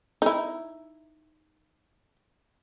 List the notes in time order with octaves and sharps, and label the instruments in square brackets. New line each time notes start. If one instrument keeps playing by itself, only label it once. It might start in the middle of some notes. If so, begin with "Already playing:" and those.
[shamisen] D#4 E4